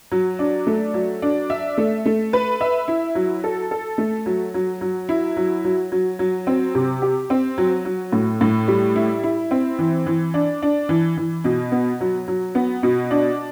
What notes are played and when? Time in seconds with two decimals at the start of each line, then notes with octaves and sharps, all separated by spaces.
0.12 F#3
0.39 D4
0.67 A3
0.94 F#3
1.22 D4
1.50 E5
1.78 A3
2.06 A3
2.33 B4
2.61 E5
2.88 E4
3.15 F#3
3.44 A4
3.71 A4
3.98 A3
4.26 F#3
4.54 F#3
4.81 F#3
5.09 E4
5.37 F#3
5.65 F#3
5.92 F#3
6.19 F#3
6.47 C4
6.75 C3
7.02 G4
7.30 C4
7.58 F#3
7.85 F#3
8.13 A2
8.41 A2
8.68 G3
8.96 E4
9.23 E4
9.51 C4
9.79 E3
10.06 E3
10.34 D4
10.62 D4
10.89 E3
11.17 E3
11.44 B2
11.72 B3
12.01 F#3
12.28 F#3
12.55 B3
12.83 B2
13.11 D4